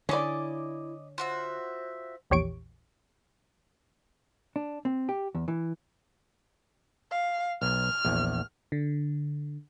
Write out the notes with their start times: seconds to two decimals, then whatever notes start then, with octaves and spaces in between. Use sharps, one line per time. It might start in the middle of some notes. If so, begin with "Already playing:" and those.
0.09 D3 C#4 E4 D5 D#5 D6
1.18 F4 F#4 C5 E5
2.30 A#1 E2 G4 C#5 C#6 D7
4.56 D4
4.85 C4
5.09 G4
5.35 E2
5.48 E3
7.11 F5
7.62 B1 F6
8.05 A#1 E2
8.72 D3